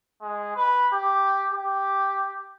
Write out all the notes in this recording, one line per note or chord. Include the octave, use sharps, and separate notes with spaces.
G#3
B4
G4
G4